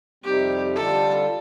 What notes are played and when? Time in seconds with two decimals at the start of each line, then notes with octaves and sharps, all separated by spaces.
0.24 F2 C3 G3 C4 D#4 G4
0.75 D3 G3 D4 F4 A4